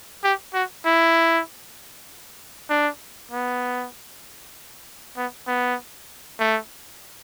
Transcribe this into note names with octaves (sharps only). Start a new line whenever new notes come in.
G4
F#4
E4
D4
B3
B3
B3
A3